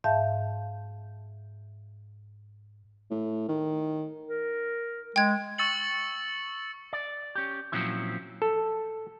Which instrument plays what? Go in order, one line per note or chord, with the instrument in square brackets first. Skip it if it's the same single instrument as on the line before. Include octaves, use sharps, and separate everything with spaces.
[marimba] G#2 E5 F5 A5 G6
[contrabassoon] A2
D#3
[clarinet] A#4
[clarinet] G#3 [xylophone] G5 G#6
[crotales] C#6 E6 A6 C#7 F#7
[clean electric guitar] D5
C#4 G4
A#2 F3 F#3 C4 C#4 E4
[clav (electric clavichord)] A4